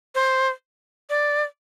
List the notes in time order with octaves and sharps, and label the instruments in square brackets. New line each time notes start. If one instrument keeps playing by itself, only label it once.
[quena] C5
D5